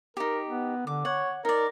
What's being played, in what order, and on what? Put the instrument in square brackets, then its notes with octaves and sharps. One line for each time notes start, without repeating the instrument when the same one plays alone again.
[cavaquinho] D#4 G4 [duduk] A#4
[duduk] B3
[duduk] D3 [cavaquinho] D6
[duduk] C#5 [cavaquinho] F#5
[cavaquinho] D#4 D5 [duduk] A#4